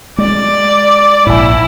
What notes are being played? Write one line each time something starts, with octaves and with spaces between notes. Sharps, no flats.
G#3 D5
A#1 G#2 E4